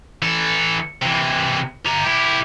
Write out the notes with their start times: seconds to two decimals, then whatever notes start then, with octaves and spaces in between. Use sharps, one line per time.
0.22 E3 A4
1.02 C3 E3
1.86 G4 A#5
2.06 E4 G4